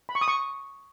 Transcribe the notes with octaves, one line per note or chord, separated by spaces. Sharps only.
B5
C#6
D#6
C#6